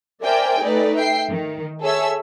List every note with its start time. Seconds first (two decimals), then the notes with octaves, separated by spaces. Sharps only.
0.23 A#4 C5 D5 E5 G5 G#5
0.62 A3 D#4 B4 D5
0.97 E5 G5 C7
1.28 D#3
1.82 G#4 A4 C#5 E5 E6